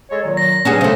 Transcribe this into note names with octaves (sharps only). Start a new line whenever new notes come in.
G#3 A4 C#5
A#2 D#3 F#3
A#6
G2 F#3 B3 C#4 F#4 G#4
C#3 A3 C5